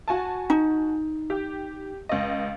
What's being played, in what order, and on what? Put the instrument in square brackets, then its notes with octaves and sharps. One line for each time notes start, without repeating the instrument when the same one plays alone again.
[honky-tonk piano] F#4 G#5 A5
[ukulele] D#4
[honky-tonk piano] G4
C#2 D#5